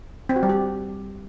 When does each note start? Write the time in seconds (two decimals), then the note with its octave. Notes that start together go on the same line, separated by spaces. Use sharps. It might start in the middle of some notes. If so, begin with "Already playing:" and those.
0.29 C4
0.36 F#4
0.43 G3
0.49 G4